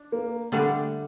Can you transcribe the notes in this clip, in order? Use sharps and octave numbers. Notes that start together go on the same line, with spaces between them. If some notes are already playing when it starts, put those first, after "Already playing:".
Already playing: D4
A#3
D3 G3 A3 D4